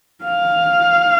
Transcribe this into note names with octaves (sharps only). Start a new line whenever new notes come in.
F5